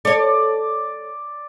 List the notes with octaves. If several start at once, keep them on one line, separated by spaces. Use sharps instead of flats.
A4 C#5 D5